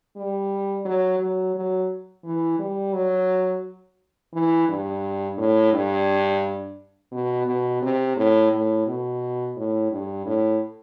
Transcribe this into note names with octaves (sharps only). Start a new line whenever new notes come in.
G3
F#3
F#3
F#3
E3
G3
F#3
E3
G2
A2
G2
B2
B2
C3
A2
A2
B2
A2
G2
A2